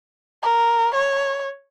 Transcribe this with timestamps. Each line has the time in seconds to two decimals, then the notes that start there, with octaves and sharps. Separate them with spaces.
0.43 A#4
0.95 C#5